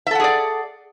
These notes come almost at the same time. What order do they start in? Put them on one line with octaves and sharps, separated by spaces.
E5 A4 F#5 G#4 D5